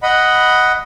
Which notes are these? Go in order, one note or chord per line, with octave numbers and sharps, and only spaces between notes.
D#5 F#5 B5